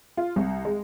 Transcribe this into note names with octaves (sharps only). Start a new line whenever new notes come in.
F4
C2
G#3